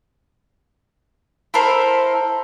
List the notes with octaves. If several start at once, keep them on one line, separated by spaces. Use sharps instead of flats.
E4 A4 A#4 C5